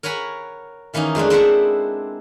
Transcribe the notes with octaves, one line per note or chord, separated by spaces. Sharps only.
A#4 C#5 F#5 G#5 B5
D#3 E3 A#3 C#4 D#4
F2 G#3 A3 D4
C4 E4 C5 E5 F#5 A#5